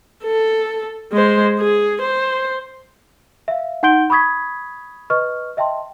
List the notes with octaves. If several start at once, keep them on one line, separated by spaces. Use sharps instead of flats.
A4
G#3 C5
G#4
C5
E5 F5
D#4 F#5 C6 G6 D7 G7
B5 C#6 D#6 G#6 B6
B4 D#5 C#6 F6
D#5 E5 G5 A5 C6